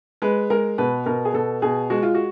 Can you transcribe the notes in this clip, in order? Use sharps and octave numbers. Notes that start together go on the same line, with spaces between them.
G#3 B4
G#3 A#4
B2 B4
B2 A#4
G#4
B2 A4
B2 G#4
G#3 F#4
F4
F#4